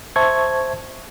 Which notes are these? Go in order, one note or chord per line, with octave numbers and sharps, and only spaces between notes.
C5 E5 A5 C#6 G#6